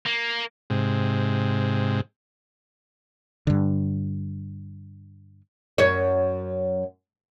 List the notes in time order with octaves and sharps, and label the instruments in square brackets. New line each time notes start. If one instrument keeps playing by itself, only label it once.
[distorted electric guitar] A#3
[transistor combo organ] G#2 C3
[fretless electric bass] G2 D3
[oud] F#2 C#5